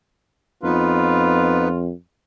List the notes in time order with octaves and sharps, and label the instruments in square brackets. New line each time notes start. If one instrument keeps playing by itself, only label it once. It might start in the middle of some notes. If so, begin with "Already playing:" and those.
[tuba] F2 [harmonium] B3 D#4 B4 [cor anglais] F4